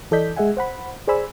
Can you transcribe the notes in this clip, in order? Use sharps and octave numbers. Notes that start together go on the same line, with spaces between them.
E3 A4 D5 D#5 G6 B6
G#3 G#4 D#5 E5 F#5 G#5
C5 F#5 B5
G#4 C5 D5 G#5 B5 E6